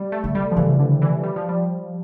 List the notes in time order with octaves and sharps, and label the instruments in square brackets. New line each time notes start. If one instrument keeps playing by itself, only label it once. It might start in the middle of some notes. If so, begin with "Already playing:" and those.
Already playing: [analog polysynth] G3
A3
[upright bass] D3
[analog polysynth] G3
F3
[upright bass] C#3 [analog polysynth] E3
[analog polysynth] D3
E3
G3
F3
G3